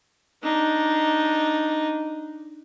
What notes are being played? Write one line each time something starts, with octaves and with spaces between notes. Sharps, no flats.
D4 D#4